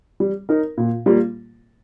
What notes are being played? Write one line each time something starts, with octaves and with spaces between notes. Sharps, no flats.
G3
D#4 A#4
A#2
G3 A#3 F4